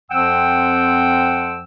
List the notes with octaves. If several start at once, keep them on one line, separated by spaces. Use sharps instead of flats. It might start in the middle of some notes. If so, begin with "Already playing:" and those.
F2 F3 C4 F#5 G5 E6